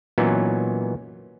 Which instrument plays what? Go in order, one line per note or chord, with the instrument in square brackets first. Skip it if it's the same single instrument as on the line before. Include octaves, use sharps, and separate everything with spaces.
[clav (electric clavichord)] A#2 E3 F#3 B3 C#4 D#4